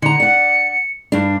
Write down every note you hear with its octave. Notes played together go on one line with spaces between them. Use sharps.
D3 A#5 C#7
D5 F#5
G2 D4